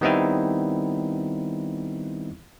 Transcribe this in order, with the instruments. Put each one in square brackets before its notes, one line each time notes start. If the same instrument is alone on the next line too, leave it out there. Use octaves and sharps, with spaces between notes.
[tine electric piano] D#3 G3 B3 C4 D#4 E4